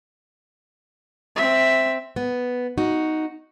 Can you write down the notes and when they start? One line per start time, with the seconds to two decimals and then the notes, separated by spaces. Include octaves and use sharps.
1.36 C4 E5
2.16 B3
2.78 D#4 F#4